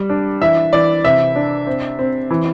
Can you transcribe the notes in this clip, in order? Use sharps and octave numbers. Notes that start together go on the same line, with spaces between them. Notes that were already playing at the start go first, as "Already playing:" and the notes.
Already playing: G3
D4
E3 E5
E3 D5
C3 E5
D4
C4
C4
E3